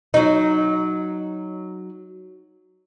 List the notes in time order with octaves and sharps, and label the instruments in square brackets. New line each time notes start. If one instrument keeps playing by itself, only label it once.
[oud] F#3 D#4